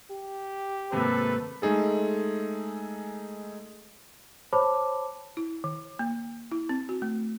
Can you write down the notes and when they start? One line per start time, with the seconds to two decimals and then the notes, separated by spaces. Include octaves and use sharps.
0.11 G4
0.92 D#2 G#2 C3 A3 A#3 A4 B4
1.62 G#3 A3 D#4 G#4 A4
4.53 C5 C#5 A5 B5 D6
5.37 E4
5.64 D#3
5.99 A#3
6.52 E4
6.69 C4
6.89 F#4
7.02 A3